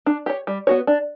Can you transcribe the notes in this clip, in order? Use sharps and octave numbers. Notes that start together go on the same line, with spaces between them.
D4
G4 C#5
G3
B3 F#4 C#5
D4